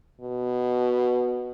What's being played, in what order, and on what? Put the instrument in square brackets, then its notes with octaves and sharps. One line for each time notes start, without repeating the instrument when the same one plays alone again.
[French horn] B2